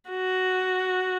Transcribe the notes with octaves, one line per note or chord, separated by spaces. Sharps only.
F#4